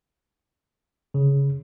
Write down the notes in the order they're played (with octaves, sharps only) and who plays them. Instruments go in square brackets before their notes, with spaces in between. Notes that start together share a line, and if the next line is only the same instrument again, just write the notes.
[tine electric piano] C#3